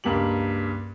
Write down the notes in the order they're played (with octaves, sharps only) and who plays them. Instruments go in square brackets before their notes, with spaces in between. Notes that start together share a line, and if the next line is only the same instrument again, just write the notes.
[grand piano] C#2 G2 A#3 G4 F#7